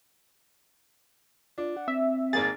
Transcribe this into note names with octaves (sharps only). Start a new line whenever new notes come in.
D4 F4
F#5
C4 E5
G#1 A#3 G#4 A6